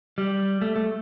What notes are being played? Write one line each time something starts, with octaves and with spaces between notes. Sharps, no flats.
G3
A3
A3